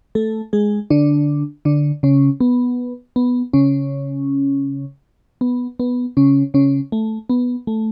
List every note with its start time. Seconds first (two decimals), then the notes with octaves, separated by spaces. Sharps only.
0.15 A3 A4
0.53 G#3 G#4
0.90 D3 D4
1.65 D3 D4
2.03 C#3 C#4
2.40 B3
3.16 B3
3.53 C#3 C#4
5.41 B3
5.80 B3
6.17 C#3 C#4
6.54 C#3 C#4
6.92 A3
7.30 B3
7.67 A3